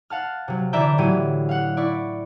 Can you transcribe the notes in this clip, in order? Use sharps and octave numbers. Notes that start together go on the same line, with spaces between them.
F5 F#5 A5 F6
C3 F#3
D3 E3 D5 E5 A#5 G6
D2 A2 E3 F#3 G4 D#7
F5 F#5
E4 D5 C#6